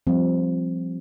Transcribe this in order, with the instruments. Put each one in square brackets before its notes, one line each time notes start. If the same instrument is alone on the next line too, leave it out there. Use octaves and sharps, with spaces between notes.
[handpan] F3 G3 C4